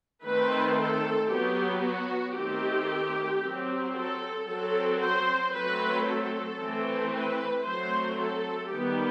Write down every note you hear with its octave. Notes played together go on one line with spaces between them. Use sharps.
D#3 A3 C4 B4
A4
F#3 B3 G4
F#4
D#3 A3 C4 G4
F#3 C4
A4
F#3 C4 A4
C5
F#3 A3 C4 B4
A4
E3 A3 C4
B4
F#3 A3 C4 C5
A4
D#3 G3 B3 G4